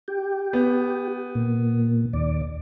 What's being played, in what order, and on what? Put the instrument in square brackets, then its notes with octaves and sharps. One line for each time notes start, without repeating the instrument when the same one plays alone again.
[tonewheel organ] G4
[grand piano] B3
[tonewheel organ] A#2
D#2 D5